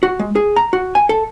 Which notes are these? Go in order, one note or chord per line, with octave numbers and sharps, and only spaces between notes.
F#4
G#3
G#4
A#5
F#4
G#5
A4